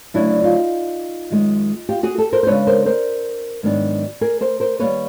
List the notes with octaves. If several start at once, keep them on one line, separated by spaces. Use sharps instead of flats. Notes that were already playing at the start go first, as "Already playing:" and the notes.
D2 C#3 F#3 D4 E4
D#4 F4
F#2 D#3 G#3
F4 G4
F#4 G#4
G4 A4
A#4 C5
C5
C#3 F3 G#3 B3 D4 B4 C#5
A#4 C5
A#4 C5
G#2 D#3 F#3 B3 D4
G#4 A#4
A#4 C5
A#4 C5
D#2 D#3 G3 A#3 B4 C#5